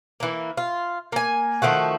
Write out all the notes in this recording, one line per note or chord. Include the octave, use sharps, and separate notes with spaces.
E3 A#3
F4
A#3 G#5
D#3 F3 A3 F#4